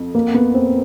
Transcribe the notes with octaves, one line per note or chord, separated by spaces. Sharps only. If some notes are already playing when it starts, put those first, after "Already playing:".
Already playing: F2
A#3
B3
C4